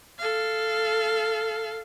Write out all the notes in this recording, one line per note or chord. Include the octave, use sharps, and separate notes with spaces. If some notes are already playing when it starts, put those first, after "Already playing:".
A4 F5